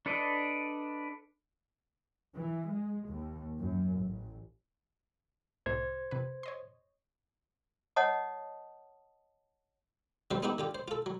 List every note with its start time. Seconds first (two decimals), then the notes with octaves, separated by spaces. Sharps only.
0.06 D4 A4 B4 D5 D#5
2.36 E3
2.70 G#3
3.09 D#2
3.59 F#2
4.00 A1
5.66 C2 A2 C3 C5 G#6
6.11 F2 C3 B4
6.43 C#5 D#5 C6
7.96 C#5 D#5 F#5 A5 D#6
10.31 C#3 F#3 G3 B4 C5
10.43 B3 C4 D#4 E4 F#4 G4
10.58 D3 F4 G4
10.75 C5
10.88 F4 A4
11.06 F#3